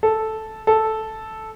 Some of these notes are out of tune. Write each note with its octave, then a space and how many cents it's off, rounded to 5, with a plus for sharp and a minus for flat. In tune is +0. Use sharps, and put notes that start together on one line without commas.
A4 -5
A4 -5